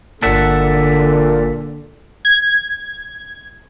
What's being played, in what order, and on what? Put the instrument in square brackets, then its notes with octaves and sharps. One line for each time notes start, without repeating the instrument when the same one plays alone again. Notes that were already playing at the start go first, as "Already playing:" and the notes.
[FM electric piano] G1 A6 [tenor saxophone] A#2 [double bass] D3 [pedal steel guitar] A4 E5 F#5
[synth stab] G#6